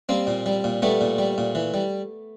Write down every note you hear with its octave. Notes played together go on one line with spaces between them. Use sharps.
G3 A#3 C4
A#2
G3
A#2
G3 A3 B3
A#2
G3
A#2
E3
G3